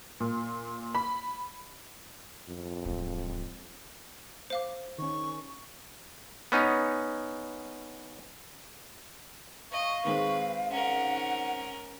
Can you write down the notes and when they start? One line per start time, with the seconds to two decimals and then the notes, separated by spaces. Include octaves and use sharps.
0.20 A#2
0.95 B5
2.48 F2
2.85 D1 G#3
4.50 C5 F5 D6
4.98 D#3 C#4 C#6
6.52 B3 C#4 D#4
9.72 D#5 F5 C#6
10.05 D#3 G#3 C4 B4
10.71 C#4 A#4 F#5